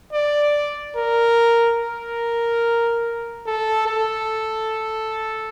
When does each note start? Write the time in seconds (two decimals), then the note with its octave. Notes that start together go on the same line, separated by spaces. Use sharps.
0.13 D5
0.96 A#4
1.79 A#4
3.46 A4
3.87 A4